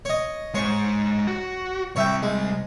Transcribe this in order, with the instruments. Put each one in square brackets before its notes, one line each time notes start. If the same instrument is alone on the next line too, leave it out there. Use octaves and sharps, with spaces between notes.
[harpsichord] C#5 D#5
[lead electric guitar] G#3 C5 [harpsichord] C#5 C#6
[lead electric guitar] F#4
[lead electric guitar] C3 G3 [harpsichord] C#5 E5 G5
[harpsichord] G#3